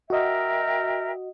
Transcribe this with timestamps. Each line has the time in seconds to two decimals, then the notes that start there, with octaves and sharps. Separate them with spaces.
0.10 F#4 A#4 D#5 E5 G5